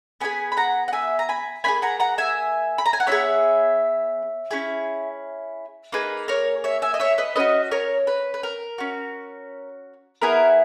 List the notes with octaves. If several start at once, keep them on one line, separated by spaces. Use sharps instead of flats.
B3 E4 G#4 G#5 B5
B5
F#5 A#5
F#5
E5 G#5
A#5
G#5 B5
A#3 D#4 G#4 G#5 B5
F#5 A#5
F#5 A#5
E5 G#5
B5
A#5
G#5
F#5
B3 E4 G#4 C#5 E5
C#4 E4 G#4
A#3 D#4 G#4 B4
A#4 C#5
C#5 E5
E5 G#5
D#5
C#5 E5
B4 D#5
C#4 F#4 B4 D#5
A#4 C#5
B4
B4
A#4
C#4 F#4
B3 E4 G#4 A#4